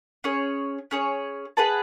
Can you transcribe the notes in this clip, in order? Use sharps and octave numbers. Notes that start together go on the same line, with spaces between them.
C#4 G#4 C#5
C#4 G#4 C#5
G#4 B4 F#5 A5